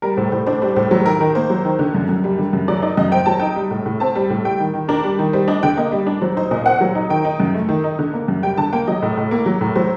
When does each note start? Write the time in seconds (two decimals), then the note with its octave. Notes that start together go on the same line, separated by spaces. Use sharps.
0.02 G3 A#4
0.17 A2 C5
0.31 A2 C5
0.47 D4 C5
0.62 G3 C5
0.76 A2 C5
0.91 F#3 C5
1.05 D#3 A#4
1.20 D#3 A#4
1.35 A#3 C5
1.50 F#3
1.65 D#3
1.79 D3
1.94 F#2
2.09 F#2
2.24 G3
2.39 D3
2.53 F#2
2.68 F#3 D5
2.82 D#4 D5
2.97 F#2 D#5
3.11 C4 G5
3.26 F#3 A5
3.39 D#4 G5
3.56 G3
3.71 A2
3.86 A2
4.00 C4 A5
4.15 G3
4.30 A2
4.45 G3 G5
4.60 D#3
4.74 D#3
4.88 D4 A#4
5.04 G3
5.19 D#3
5.33 G3 C5
5.48 D4 D#5
5.63 D3 G5
5.77 A#3 D#5
5.92 G3
6.07 D4
6.22 F#3 C5
6.37 D#4 C5
6.51 A#2 D#5
6.66 C4 F#5
6.81 F#3
6.95 D#4
7.10 D#3 G5
7.25 D#4
7.40 F#2
7.54 A3
7.69 D#3
7.84 D#4
7.99 D3
8.14 A#3
8.28 F#2
8.43 G3 G5
8.57 D3 A5
8.73 A#3 G5
8.87 F#3 D#5
9.02 A2
9.17 A2
9.31 A#3
9.46 F#3
9.61 A2
9.75 F#3 C5